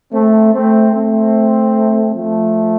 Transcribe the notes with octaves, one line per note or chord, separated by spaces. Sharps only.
A3 C4
A3 C4
A3 C4
F3 A3